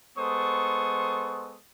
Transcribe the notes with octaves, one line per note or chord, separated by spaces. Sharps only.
G#3 B3 A4 C5 C#6 D#6